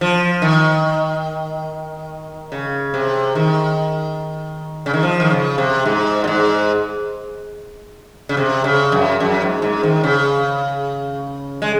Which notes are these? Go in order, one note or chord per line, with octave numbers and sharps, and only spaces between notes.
F3
D#3
C#3
C3
D#3
C#3
D#3
F3
D#3
C#3
C3
G#2
A#2
G#2
C#3
C3
C#3
F#2
F#2
G#2
G#2
D#3
C#3
G#3